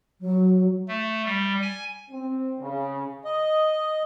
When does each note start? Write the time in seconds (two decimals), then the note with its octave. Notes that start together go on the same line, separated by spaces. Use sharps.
0.20 F#3
0.88 A3
1.25 G3
1.62 G#5
2.10 C4
2.59 C#3
3.25 D#5